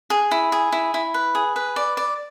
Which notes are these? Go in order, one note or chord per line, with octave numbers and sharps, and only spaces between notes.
G#4
E4
G#4
E4
E4
B4
G#4
B4
D5
D5